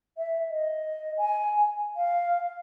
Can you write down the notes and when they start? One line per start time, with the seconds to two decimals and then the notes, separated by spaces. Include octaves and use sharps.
0.17 E5
0.50 D#5
1.17 G#5
1.96 F5